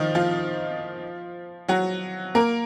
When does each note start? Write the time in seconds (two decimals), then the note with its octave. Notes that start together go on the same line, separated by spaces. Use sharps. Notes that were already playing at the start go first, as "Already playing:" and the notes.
Already playing: D#3 F3 D#4 F4
0.15 F3 F4
1.68 F#3 F#4
2.35 A#3 A#4